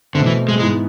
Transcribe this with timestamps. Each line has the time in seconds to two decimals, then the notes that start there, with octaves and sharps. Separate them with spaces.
0.14 B2 D3 A3 C4
0.26 E3
0.49 G#3
0.59 G#2 E3 G#3 B3